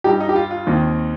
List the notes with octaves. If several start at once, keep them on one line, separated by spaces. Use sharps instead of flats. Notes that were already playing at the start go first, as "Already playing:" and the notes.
G2 G3 D#4 G4
D#4
G4
F4
F4
D#2 D#3 C4